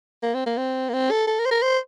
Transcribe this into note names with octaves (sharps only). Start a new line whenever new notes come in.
A#3
C4
A#3
C4
A#3
C4
A4
A4
A#4
C5
A#4
C5